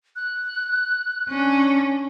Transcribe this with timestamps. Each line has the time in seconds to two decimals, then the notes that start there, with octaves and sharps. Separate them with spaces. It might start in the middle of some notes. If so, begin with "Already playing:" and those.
0.16 F#6
1.29 C#4 D4